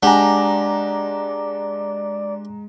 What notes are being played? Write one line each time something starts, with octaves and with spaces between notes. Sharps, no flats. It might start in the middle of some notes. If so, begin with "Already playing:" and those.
G#3 D4 G4 D5 F#5 G#5 A#5